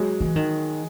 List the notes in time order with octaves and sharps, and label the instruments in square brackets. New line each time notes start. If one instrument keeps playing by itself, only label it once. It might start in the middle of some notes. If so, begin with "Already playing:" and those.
Already playing: [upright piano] F#3 G#3
[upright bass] E3
D#3